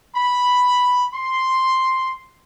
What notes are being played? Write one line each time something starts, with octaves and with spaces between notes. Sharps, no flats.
B5
C6